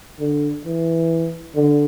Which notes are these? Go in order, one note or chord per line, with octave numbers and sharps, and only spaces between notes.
D3
E3
D3